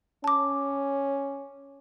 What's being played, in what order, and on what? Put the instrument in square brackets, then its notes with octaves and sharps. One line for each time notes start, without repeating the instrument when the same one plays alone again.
[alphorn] C#4 [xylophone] A5 D6